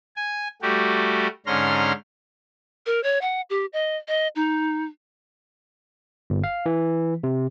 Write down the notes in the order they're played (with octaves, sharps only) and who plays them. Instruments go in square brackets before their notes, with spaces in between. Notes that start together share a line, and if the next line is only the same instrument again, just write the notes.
[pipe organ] G#5
G3 A3 F#4 G4
G#2 D3 C#4 A#5 C6 F6
[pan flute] A#4
C#5
F#5
G4
D#5
D#5
D#4
[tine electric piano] G1
F5
E3
C3